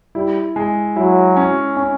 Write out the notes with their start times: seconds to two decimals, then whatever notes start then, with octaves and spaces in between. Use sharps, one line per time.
0.15 G3 E4
0.56 G#3
0.96 F#3 E4
1.36 C#4
1.77 C#4